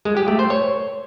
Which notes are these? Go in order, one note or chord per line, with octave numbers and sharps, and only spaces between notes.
G#3
G4
A3
C5
C#5